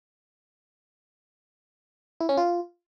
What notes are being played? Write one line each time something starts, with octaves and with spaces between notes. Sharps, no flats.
E4
C#4
F4